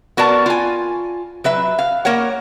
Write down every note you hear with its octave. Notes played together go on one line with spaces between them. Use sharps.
B3 F#4 A#4 D5 A5
F4 G#5
F#3 B4 E5
F5
A#3 A#4 C#5 F#5